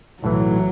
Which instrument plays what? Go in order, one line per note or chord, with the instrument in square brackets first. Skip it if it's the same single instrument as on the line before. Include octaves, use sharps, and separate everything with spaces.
[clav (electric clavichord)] B1 A2 E3 [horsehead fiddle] F#3